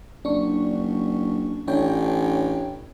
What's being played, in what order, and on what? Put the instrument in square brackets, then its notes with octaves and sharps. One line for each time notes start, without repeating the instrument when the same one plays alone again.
[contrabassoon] F#1 [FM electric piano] D4 C#6
[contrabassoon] A1 [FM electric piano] D4 C#5 G5